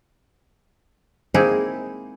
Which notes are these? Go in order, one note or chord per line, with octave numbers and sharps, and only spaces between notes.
G#3 A#3 C4 D#4 E4 G#4